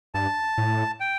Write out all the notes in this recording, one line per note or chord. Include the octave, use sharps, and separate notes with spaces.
G2 A5
A2
G5